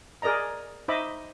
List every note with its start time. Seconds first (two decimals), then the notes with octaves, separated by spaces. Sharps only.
0.22 G#4 A#4 D5 D#5 A#5
0.88 D#4 C5 D#5 E5 B5 D6